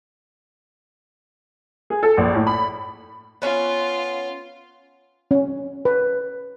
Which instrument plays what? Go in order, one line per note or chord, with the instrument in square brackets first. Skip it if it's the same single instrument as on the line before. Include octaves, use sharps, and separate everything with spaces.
[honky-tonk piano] G#4
A4
A#1
A2
B5
[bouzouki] B3 C#4 B4 [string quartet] F4
[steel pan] C#4
B4